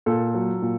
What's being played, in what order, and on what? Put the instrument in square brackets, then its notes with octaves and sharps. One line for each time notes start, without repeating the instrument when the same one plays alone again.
[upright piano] A#2 A4
F#3
A#2